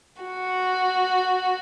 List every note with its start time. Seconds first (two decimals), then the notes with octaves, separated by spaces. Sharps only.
0.22 F#4